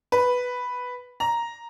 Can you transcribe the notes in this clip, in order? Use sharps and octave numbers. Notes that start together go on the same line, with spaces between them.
B4
A#5